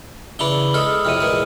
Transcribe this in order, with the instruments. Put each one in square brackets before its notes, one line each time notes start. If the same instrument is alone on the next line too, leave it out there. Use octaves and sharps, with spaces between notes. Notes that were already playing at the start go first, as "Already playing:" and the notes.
[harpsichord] C#3 E3 D4 [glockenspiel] B5 F#7 G7
[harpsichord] G#3 A4 [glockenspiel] D#6 F6
[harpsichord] F2 A2 C3 [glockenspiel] F6 D#7
[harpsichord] A#2 E3 G#3